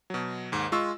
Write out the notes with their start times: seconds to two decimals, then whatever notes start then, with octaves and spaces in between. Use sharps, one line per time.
0.10 B2 F#3
0.52 D#2 G#2
0.72 G#3 F4 C#6 E6